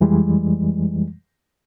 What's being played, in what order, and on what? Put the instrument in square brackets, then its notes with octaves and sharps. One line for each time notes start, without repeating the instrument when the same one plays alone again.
[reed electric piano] F2 E3 G3 G#3